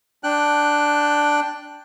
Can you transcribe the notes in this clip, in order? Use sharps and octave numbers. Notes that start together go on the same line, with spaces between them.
D4 G5 F#6